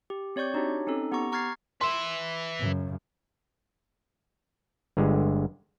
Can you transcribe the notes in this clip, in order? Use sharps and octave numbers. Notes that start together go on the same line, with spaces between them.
G4
C4 C#5 D5 C#6 G6
D4 D#4 F#4 G4 C#5
C4 C#4 D#4 A4
B3 G4 A#5 C#6
A#5 C#6 F6 G#6 A6 C7
B4 E5 C6
F#2 C#3
G1 D3 G#3